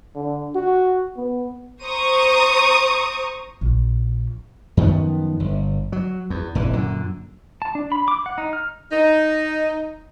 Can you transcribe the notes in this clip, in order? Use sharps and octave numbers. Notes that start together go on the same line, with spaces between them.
D3
F#4
B3
C5 A#5 C#6 D#6
A#1
F#2 D#3 F3 B3
G1
F#3
E2
F1 A#1 E3
F#2 A#2 D3
A5
D4
B5
D6
F#5
D#4
F6
D#4